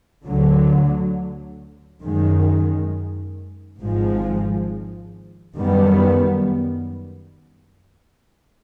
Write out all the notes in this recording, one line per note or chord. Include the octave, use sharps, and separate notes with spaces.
D2 D3 F#3
F#2 D#3 G#3
G#1 G#2 F3 G#3
F#2 D#3 G3 B3